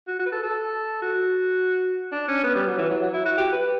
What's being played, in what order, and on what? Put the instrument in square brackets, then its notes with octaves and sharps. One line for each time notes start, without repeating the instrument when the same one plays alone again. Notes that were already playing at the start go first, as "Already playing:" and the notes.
[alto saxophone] F#4
F#4
B4
A4
A4
F#4
D4
C#4
B3
G3
F#3
E3
F#3
F#3
E4
F#4
G4
B4